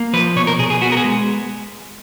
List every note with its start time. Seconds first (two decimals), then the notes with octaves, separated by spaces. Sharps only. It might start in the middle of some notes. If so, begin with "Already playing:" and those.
Already playing: A#3
0.13 F3 B4
0.36 B2 C#5
0.47 A#4
0.59 B2 G#4
0.70 G#4
0.81 B3 F#4
0.92 A#4
0.97 G#4
1.04 G#3